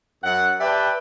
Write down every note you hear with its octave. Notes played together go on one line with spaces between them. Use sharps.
F#2 F#5
G4 B4 D5 E5 G5 A5